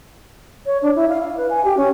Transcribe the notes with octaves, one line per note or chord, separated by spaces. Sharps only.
C#5
D4
E4
F5
F5
B4
G#5
G4
C#4